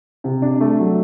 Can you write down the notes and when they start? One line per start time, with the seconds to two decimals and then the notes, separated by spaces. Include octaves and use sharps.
0.24 C3
0.42 D4
0.61 A3
0.79 F#3